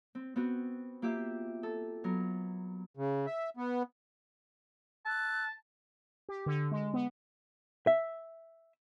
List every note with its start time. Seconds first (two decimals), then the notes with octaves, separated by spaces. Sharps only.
0.15 C4
0.36 B3 C4 F#4
1.02 A#3 F4 G4 E5
1.63 A4
2.04 F#3 B3 A#4
2.97 C#3
3.26 E5
3.57 B3
5.06 A5 E6 F#6
6.29 G4
6.46 D3
6.71 G#3
6.94 B3
7.87 E5